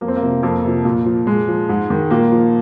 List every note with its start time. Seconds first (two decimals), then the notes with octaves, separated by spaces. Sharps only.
0.01 F2 A#3
0.08 C4
0.16 A#3
0.22 C3 F3
0.43 F2 A#3
0.64 C3 F3
0.85 A#2
1.06 F3
1.27 A#2 G#3
1.48 F3
1.69 G#2
1.90 D#3
2.11 A#2 A#3
2.32 F3